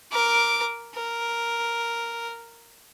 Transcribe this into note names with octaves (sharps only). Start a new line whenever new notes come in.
A#4 D6
A#4